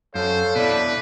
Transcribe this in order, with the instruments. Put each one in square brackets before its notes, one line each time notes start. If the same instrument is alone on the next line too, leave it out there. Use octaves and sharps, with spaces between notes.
[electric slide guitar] F#2 [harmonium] A4 F5 [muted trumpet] C5 [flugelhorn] C#5
[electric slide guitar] B2 E4 [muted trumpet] B4 [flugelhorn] D5